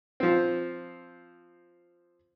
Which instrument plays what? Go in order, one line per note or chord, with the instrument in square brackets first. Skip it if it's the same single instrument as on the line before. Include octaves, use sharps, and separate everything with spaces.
[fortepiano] F3 C4